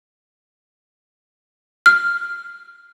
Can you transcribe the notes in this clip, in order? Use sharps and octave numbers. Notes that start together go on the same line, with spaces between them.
F6